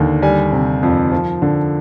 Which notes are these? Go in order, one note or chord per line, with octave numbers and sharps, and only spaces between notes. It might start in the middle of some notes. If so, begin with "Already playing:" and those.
Already playing: D#2 D3
G3 G#5
C3
F2
F3
D3